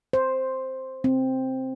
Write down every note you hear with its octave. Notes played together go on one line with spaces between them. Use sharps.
C5
C4